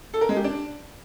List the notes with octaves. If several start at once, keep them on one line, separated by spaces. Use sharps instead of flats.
A4
A#4
G#3
G4
D4